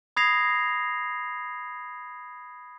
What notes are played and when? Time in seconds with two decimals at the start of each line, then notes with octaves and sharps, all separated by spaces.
0.16 B5 D#6 G#6 A#6 C7 F7